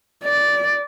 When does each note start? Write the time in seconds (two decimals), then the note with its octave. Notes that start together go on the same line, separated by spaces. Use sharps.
0.24 D5